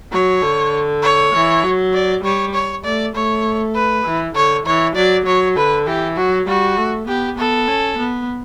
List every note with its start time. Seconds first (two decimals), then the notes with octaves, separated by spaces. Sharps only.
0.12 F#3 C#5
0.42 D3
1.03 C#5
1.34 E3
1.63 F#3
1.93 D5
2.24 G3 C#5
2.53 C#5
2.84 A3 D5
3.15 A3 C#5
3.75 B4
4.05 E3
4.35 D3 C#5
4.66 E3 C#5
4.95 F#3 D5
5.26 F#3 C#5
5.56 D3 B4
5.86 E3 G4
6.17 F#3 F#4
6.47 G3 F#4
6.77 A3
7.07 B3 G4
7.38 B3 A4
7.68 C#4
7.98 B3